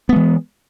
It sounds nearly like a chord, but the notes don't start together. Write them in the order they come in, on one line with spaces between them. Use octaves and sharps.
B3 G#3 E3